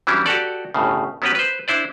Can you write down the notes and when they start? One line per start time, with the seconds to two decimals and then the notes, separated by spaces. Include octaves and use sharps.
0.07 E3 F#3 G3 C#4 D4 E4
0.26 F#4 G4 A4 D5
0.74 G1 A2 C#3
1.22 F#3 B3 C#4 F#4 G4 B4
1.35 B4 C5
1.68 D4 E4 C5 D5